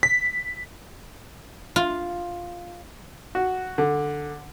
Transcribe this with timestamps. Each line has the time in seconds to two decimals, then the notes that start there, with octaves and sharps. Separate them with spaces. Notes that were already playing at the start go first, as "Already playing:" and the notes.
0.03 B6
1.76 F4
3.35 F#4
3.78 D3